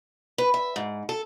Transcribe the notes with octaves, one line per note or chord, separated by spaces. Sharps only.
B4
E5
G#2
A4